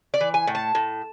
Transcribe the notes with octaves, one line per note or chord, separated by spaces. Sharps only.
D5
E3
G#5
A2
A5
A2